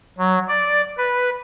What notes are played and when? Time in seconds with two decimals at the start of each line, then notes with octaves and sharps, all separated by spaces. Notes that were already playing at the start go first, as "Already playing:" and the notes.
0.18 F#3
0.48 D5
0.98 B4